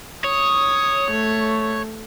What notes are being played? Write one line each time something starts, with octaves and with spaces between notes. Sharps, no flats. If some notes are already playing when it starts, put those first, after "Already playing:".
C#5 D#6
A3